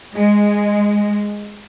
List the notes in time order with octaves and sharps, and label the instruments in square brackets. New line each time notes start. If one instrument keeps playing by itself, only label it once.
[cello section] G#3